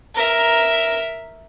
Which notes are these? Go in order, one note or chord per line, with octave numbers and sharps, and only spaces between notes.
A#4 E5